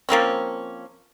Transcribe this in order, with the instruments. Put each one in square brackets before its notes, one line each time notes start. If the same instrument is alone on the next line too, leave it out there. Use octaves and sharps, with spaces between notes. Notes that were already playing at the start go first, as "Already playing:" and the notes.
[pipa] F3 A#3 C4 C#4